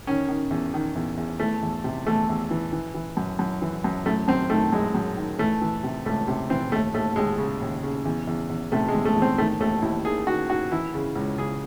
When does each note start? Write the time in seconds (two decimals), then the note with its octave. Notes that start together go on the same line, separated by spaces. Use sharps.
0.07 D#3 C#4
0.28 D#3
0.51 E2
0.74 D#3
0.95 E2
1.17 E2
1.40 E3 A3
1.62 E2
1.84 C3
2.06 E2 A3
2.29 E2
2.51 E3
2.73 E3
2.94 E3
3.17 F#2
3.39 F#2
3.62 E3
3.84 F#2
4.06 F#2 A3
4.28 F#2 C4
4.50 D#3 A3
4.72 F#2 G#3
4.95 F#2
5.16 D#3
5.39 E3 A3
5.61 E3
5.83 C3
6.05 C#2 A3
6.28 C3
6.50 E3 C4
6.72 D#2 A3
6.94 D#2 A3
7.16 D#2 G#3
7.38 C#3
7.61 D#2
7.83 C#3
8.05 E2
8.27 E2
8.49 E2
8.72 C3 A3
8.88 G#3
8.94 E2
9.05 A3
9.16 E2
9.22 C4
9.38 D#3 A3
9.60 D#2 A3
9.82 D#2 E4
10.04 D#3 G#4
10.27 D#3 F#4
10.49 D#3 F#4
10.71 E3 E4
10.94 C#3
11.15 C#2
11.38 C#3 G#4